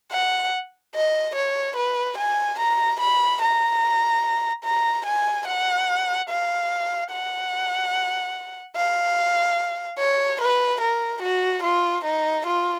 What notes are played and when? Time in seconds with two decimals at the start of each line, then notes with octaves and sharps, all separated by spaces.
0.12 F#5
0.95 D#5
1.35 C#5
1.77 B4
2.18 G#5
2.60 A#5
3.00 B5
3.42 A#5
4.64 A#5
5.06 G#5
5.47 F#5
6.29 F5
7.11 F#5
8.76 F5
9.99 C#5
10.41 B4
10.81 A#4
11.23 F#4
11.63 F4
12.04 D#4
12.47 F4